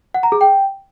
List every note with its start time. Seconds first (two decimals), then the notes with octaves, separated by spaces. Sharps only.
0.14 F#5
0.23 A#5
0.32 G#4
0.41 G5